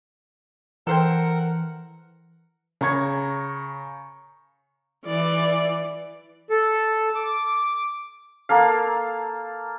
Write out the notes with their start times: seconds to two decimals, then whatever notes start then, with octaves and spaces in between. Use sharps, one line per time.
0.87 E3 A4 A#4 C5 F#5 G5
2.81 C#3 A#5 C#6 G#6
5.05 E3 D5
6.50 A4
7.15 D6
8.49 A#3 A4 F5